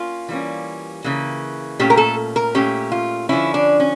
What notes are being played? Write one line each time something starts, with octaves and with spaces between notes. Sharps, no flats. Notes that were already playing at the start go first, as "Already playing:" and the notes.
Already playing: A#3 C#4 F4
E3 G3 A#3 C#4
C#3 E3 A#3
A#2 A3 C#4 G4
A#4
A4
A#4
A#2 A3 C#4 G4
F4
D3 F3 C#4 E4
D4
C#4